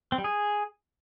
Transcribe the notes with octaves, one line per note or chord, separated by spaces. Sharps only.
C4
G3
G#4